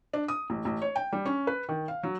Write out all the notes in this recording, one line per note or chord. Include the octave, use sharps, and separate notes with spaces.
D4
D#6
A1
A1
C#5
G5
G3
C#4
B4
D#3
F5
F#3